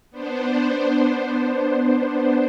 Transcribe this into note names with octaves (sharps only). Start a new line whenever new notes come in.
B3 D4 C5